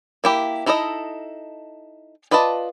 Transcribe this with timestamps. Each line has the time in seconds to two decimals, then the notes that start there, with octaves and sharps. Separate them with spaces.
0.24 A#3 E4 G4
0.66 D#4 E4 A4 C#5 D#5
2.31 F4 B4 D5 D#5 A5